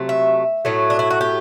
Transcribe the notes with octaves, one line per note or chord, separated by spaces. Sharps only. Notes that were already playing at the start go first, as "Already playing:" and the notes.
Already playing: C3 F#3 A3
E5
A2 F#3 A3
D4
E4
F#4
G4